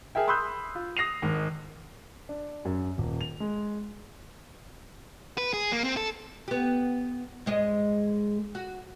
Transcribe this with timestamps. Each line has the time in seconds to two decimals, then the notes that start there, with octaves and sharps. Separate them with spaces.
0.15 G#4 A#4 E5 G5
0.28 B5 C6 D#6 E6 F#6 G6
0.75 F4
0.97 D#6 A#6 C7 F7
1.22 G#1 G#2
2.29 D4
2.65 F#2
2.98 D#1
3.21 F7
3.40 G#3
5.38 B4
5.53 G#4
5.72 A#3
5.84 C4
5.97 A4
6.48 B3 G4
7.46 G#2 G#3 D#5
8.55 F#4